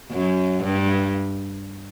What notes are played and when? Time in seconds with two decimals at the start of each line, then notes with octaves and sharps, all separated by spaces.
0.11 F#2
0.64 G2